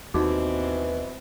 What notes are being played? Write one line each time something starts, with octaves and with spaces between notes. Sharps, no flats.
D#2 B2 E3 C4 D#4 F#4 D6